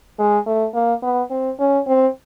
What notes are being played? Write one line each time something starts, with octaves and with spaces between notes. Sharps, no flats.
G#3
A3
A#3
B3
C4
C#4
C4